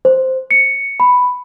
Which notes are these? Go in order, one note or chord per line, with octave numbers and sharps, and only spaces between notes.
C5
C#7
B5